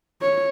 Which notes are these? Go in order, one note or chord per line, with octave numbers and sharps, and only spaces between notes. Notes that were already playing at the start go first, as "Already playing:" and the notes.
C#5